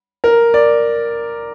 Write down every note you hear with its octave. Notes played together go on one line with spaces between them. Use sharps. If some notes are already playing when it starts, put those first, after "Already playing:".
A#4
D5